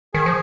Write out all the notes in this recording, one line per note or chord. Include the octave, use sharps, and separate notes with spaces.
D#3 G#4
F3